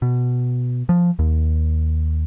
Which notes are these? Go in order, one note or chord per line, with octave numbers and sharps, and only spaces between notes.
B2
F3
D#2